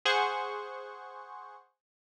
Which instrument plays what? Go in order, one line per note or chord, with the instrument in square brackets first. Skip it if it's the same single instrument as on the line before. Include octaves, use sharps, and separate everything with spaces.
[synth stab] G#4 C5 F#5 C#6